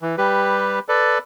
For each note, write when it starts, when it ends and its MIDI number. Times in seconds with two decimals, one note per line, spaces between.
0.01 0.16 52
0.18 0.79 55
0.18 0.79 67
0.18 0.79 71
0.89 1.18 69
0.89 1.18 71
0.89 1.18 74